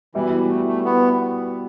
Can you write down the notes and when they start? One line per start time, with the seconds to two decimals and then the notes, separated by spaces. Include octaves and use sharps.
0.15 B2 E3 G3 E4
0.49 A3
0.67 A3
0.85 B3